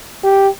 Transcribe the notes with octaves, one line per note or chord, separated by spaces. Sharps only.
G4